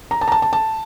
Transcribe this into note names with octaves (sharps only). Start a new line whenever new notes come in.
A#5
A5
A#5
A5
A5
A5